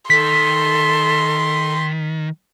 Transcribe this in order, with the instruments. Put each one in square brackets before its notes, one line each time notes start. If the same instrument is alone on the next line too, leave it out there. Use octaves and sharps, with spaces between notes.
[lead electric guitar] D#3 [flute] A4 [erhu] C6 [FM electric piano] B6